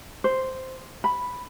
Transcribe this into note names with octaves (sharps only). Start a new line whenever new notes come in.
C5
B5